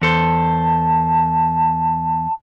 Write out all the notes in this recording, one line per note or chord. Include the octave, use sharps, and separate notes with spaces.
E2 A4 C5 A5